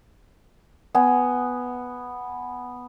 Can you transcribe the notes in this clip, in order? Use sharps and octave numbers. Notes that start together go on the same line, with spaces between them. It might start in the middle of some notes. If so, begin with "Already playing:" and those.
B3 G#5